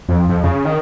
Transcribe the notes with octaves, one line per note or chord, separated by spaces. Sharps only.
F2
F2
C#3
D#3